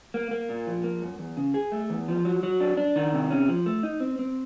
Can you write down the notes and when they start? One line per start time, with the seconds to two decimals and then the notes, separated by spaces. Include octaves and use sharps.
0.14 A#3
0.31 A#3
0.49 A#2
0.67 F3
0.84 A#3
1.02 F#2
1.19 E2
1.37 C#3
1.54 G#4
1.72 A3
1.90 E2
2.08 F3
2.25 F#3
2.43 F#3
2.60 D4
2.77 D4
2.96 D#3
3.13 C3
3.30 C#4
3.49 F3
3.66 A3
3.83 D#4
4.00 C4
4.19 C4